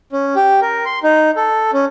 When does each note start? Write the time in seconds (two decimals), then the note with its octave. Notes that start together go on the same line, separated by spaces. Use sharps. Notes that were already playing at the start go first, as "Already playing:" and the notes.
0.13 C#4
0.35 G4
0.62 A#4
0.85 C6
1.03 D#4
1.36 A4
1.73 C#4